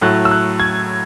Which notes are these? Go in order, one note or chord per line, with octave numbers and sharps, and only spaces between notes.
A2 F#3 A3 F#6
E6
F#6
G#6